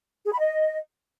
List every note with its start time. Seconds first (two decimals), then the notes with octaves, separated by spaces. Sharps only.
0.25 G#4
0.32 B5
0.39 D#5